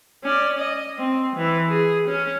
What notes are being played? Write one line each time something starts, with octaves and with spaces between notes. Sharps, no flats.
C#4 D5
D#5
C4
E3
G#4
C#4